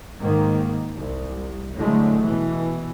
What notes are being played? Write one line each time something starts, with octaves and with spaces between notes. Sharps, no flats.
G#2 D#3 A#3
C2
A2 D3 F#3 G#3 A3
B2 E3